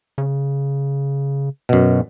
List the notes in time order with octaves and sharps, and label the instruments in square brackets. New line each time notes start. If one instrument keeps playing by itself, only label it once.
[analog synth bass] C#3
[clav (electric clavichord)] F#2 B2